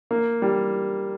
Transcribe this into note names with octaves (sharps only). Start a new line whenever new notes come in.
A#3
G3